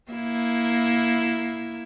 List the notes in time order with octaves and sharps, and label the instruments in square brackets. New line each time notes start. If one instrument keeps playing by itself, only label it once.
[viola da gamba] A#3 E4